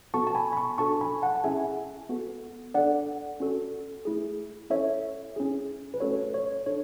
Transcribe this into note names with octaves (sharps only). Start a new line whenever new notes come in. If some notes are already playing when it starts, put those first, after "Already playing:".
B3 F#4 A4 A5 C#6
A5
G#5 B5
B5
A5 C#6
D4 F#4 A4 A5 C#6
G#5 B5
F#5 A5
A5
C#4 E4 G#4 E5 G#5
B3 F#4 A4
D4 A4 D5 F#5
C#4 F#4 A4
A3 E4 G#4
C#4 E4 A4 C#5 E5
C#4 E4 G#4
B4
A3 C#4 F#4 A4 C#5
C#5
D4 A4 C#5